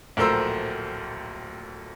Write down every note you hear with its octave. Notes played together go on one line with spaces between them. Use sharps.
D1 A#1 A3 A#4 C5 E6